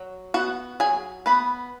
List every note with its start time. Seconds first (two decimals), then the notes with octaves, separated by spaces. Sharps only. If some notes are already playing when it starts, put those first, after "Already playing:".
Already playing: F#3
0.34 B3 F#4 F#5
0.80 F#3 G#4 G#5
1.26 B3 B4 B5